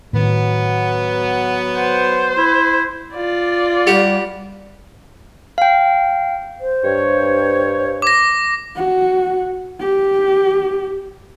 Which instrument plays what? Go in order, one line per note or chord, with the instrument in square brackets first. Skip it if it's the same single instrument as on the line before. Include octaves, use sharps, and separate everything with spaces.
[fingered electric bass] A2 D#3 [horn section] F#3 B3
[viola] C5
[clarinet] E4
[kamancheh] F4 D5
[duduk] G3 [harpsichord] F#4 G4
[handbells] F5 G5
[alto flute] C5
[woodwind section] G2 C#5
[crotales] D6 A#6
[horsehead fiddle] F#4
G4